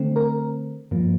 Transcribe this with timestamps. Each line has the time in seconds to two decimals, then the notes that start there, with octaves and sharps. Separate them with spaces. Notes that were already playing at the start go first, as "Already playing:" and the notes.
Already playing: D3 A3 C4
0.16 A#4
0.91 G2 F3 A#3